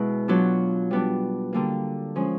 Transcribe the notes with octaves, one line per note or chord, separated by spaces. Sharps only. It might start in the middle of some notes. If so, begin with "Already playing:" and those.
Already playing: B2 G#3 B3 E4
F#3 B3 D4 F4
G3 B3 D4
D3 G3 A#3
F3 G#3 C#4